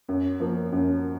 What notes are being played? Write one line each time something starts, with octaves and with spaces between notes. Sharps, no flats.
F#2
F3 A#3
F#2